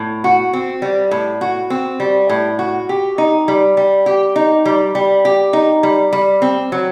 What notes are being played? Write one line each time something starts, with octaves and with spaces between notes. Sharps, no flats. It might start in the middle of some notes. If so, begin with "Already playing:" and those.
Already playing: A2
F#4
C4
G3
A2
F#4
C4
G3
A2
F#4
G4
D#4
G3
G3
G4
D#4
G3
G3
G4
D#4
G3
G3
C4
F#3